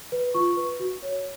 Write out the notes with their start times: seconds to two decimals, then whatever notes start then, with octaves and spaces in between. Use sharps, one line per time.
0.12 B4
0.34 F4 C#6
0.57 B4
0.80 F#4
1.03 C#5